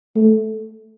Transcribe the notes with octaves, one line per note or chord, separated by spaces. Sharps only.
A3